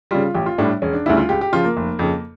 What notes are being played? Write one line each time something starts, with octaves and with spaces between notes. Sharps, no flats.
C#3 G3 F4
A1 G4
F4
A2 G3 D4
E1 C#4
D4
D2 C#3 G3 E4
F4
C#2 G4
G4
C#3 F3 F4
A#3
F1
F2 C#3